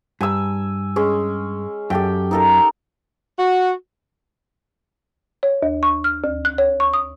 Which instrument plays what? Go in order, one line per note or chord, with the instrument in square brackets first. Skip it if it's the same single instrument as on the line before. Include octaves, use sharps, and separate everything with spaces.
[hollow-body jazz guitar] G2 [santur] G#5 E6
[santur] G#3 C#4 G#4
[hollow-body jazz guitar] F#2 [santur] G4 A4 G5
[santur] D#4 A4 A#4
[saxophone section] F#4
[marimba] C#5
D#2
C#6
F6
D2
F#6
C#5
C#6
D#6